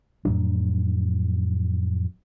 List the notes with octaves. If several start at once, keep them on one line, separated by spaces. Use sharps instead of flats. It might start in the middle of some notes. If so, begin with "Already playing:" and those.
F2 A2 F#3 D4